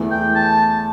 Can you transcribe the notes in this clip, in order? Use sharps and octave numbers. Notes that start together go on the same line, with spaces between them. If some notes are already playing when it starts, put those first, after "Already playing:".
Already playing: E2 E3 A3
G5
A5